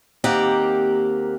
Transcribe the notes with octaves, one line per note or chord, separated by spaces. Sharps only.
D#2 A#3 C4 G4 A#4 F#5